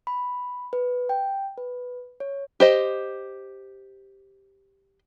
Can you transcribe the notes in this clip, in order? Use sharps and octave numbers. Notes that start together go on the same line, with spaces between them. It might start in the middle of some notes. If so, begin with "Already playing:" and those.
B5
B4
G5
B4
C#5
G4 C5 D#5